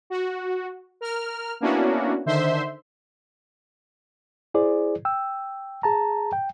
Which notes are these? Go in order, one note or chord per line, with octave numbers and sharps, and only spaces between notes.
F#4
A#4 F6
A#3 B3 C#4 D4 E4 F#4
D3 D#3 C5 E5 C6
E4 G#4 C5 D5
G5 E6
G#4 A5 A#5
G5